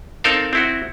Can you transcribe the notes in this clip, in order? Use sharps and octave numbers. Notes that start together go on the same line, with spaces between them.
C4 D#4 A4 A#4 F5
C4 E4 F#4